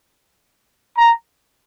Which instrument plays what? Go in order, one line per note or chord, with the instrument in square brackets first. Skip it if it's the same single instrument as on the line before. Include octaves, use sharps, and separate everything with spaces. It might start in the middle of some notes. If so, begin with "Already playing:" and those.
[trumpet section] A#5